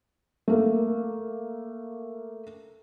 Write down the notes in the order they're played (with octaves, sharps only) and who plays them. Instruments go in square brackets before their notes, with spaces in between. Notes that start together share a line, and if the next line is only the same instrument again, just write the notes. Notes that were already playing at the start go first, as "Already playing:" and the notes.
[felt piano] A3 A#3